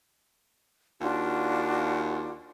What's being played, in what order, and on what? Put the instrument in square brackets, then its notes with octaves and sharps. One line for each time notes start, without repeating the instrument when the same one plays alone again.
[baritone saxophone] D#2 [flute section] D4 F4 F#4